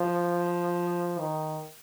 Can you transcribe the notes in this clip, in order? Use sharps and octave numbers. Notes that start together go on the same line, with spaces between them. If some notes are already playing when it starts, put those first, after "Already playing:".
Already playing: F3
D#3